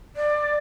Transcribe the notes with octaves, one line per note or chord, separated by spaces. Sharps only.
D5